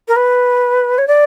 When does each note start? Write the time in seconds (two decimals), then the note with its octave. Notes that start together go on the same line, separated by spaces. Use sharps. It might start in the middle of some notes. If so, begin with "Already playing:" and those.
0.08 A#4
0.16 B4
0.98 C#5
1.07 D5